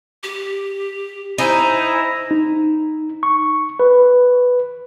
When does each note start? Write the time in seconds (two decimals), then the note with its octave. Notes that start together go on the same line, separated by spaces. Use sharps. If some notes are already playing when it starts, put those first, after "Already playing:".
0.23 G4
1.38 D#4 E4 C5 G#5 A#5
2.31 D#4
3.23 C#6
3.80 B4